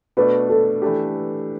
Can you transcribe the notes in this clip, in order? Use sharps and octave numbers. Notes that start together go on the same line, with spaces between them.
B2 A3 D4 B4
A4
E3 A3 D4 G4